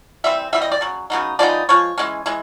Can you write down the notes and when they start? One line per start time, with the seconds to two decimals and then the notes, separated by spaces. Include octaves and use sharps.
0.24 E3 G3 C4 E5
0.53 E3 G3 C4 E5
0.62 D#5
0.72 D5
0.81 C#3 F#3
1.10 C#3 F#3 B3 D#4
1.39 F3 G#3 B3 D#4 D5
1.69 F3 G#3 C#5
1.98 E3 G#3 C#4
2.26 E3 G#3